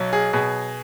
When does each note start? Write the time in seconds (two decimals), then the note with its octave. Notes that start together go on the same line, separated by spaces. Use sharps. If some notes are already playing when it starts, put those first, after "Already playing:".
Already playing: B1 F#3
0.13 G#4
0.33 B2 G#4